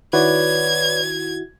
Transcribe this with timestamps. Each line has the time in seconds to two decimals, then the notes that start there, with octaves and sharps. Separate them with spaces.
0.13 D#3 E4 F#4 B4 C#5 D5 G#6